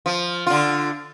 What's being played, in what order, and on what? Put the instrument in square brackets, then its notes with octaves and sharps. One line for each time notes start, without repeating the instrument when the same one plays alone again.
[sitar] F3
D3 F4